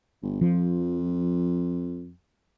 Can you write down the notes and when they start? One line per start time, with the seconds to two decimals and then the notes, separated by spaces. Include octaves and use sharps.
0.23 G1
0.41 F2 F3